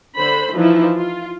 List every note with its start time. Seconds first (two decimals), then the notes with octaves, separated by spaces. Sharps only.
0.18 D3 C5 B5
0.55 E3 F3 D#4 E4
0.96 F4